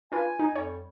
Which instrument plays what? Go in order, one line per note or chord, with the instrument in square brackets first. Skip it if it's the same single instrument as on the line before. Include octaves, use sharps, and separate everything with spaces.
[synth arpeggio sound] D4 F4 B4 [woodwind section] G#5
[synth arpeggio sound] D#4
[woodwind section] F2 G3 [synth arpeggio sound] C#5